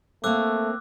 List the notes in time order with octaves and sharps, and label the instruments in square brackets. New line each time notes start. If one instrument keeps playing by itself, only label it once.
[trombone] A3 [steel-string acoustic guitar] A#3 C4 [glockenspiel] D6 E6 F#6